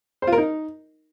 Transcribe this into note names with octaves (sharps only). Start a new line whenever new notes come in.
C5
F4
A#4
D#4